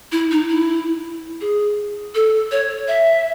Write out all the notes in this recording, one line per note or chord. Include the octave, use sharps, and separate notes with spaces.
E4
D#4
E4
G#4
A4
C#5
E5